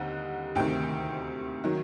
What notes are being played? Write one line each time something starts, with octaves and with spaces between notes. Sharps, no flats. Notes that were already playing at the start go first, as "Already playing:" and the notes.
Already playing: D#2 D3 G3 C4 D#4 F#5
D2 C3 D#3 G5
D#3 F#3